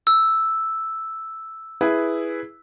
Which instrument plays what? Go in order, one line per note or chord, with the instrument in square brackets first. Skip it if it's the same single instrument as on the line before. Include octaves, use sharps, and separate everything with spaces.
[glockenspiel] E6
[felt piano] E4 G#4 B4